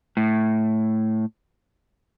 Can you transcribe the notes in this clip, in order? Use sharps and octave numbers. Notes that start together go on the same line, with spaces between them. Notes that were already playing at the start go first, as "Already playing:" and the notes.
A2